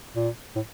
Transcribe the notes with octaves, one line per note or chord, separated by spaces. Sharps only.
A#2
A2